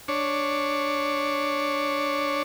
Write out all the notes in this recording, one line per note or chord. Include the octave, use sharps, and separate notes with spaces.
D4 C#5